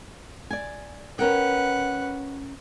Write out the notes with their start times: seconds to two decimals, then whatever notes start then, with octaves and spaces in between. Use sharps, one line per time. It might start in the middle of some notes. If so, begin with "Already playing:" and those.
0.51 D5 G#5
1.19 C#4 A#4 B4 F#5 G5